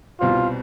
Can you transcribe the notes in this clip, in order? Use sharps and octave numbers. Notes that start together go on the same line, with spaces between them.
C2 B2 G3 C4 F4